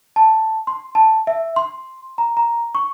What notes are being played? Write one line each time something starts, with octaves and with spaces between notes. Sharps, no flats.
A5
C6
A5
E5
C6
A#5
A#5
C#6